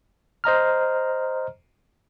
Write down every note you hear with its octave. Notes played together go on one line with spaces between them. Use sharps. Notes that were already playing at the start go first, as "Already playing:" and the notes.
C5 D#5 A#5 F6